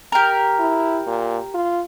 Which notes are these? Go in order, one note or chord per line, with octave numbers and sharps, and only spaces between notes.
G4 A#4
E4
A#2
F4